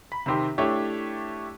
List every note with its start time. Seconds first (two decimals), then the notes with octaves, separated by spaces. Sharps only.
0.12 B5
0.26 C3 D#3 C4 G4
0.58 A3 D4 E4 G4 C#5